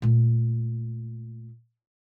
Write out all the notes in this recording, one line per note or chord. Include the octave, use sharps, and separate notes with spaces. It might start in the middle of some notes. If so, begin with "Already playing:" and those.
A#2 A3